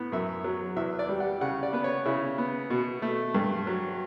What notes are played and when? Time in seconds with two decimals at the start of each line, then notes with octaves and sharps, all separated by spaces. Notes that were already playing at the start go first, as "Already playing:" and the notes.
Already playing: A2 B3
0.12 F#2 E5
0.44 F#3
0.76 E2 E5
0.99 D5
1.09 G3
1.20 F#5
1.41 C#3 F#5
1.63 D5
1.73 B3 B4
1.84 C#5
2.05 C#3 E4
2.38 B3
2.70 B2
3.02 A3
3.35 G2
3.67 F#3